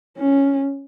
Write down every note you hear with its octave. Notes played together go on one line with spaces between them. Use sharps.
C#4